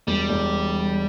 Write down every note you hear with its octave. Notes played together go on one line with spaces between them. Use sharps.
E1 G3
E1